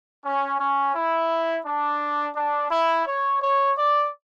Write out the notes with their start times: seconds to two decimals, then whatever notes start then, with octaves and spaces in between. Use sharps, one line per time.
0.25 C#4
0.60 C#4
0.95 E4
1.66 D4
2.36 D4
2.71 E4
3.06 C#5
3.42 C#5
3.77 D5